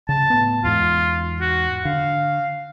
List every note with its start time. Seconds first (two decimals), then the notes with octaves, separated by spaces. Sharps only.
0.09 C#3 A5
0.30 A2 B3
0.64 E2 G#2 F4
1.41 F#4
1.85 D3 F5